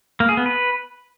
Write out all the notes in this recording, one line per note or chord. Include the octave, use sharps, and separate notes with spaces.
A#3
G#4
B3
B4